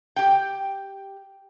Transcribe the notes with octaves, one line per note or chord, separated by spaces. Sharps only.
G4 G5